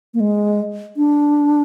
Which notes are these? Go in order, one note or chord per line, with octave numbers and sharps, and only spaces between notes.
A#3
G#3
D4